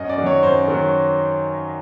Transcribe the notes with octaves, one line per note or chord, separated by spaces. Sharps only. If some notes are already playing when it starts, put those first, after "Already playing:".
Already playing: F#2 D#5
D5
D#3 F#3
C#5
F#2 C5
D#3 F#3